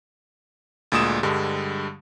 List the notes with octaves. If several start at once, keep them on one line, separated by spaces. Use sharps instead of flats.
D2 A#2 G#3 D#6 E7
G2 D3 G3 G#3